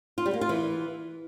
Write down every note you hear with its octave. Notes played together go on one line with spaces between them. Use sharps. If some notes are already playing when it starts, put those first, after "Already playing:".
F4
G3
A#3
F4
E3